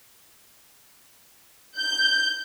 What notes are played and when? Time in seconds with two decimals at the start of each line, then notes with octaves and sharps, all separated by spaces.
1.78 G6